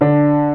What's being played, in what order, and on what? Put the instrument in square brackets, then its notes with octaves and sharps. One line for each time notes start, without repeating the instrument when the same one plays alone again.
[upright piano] D3 [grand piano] D4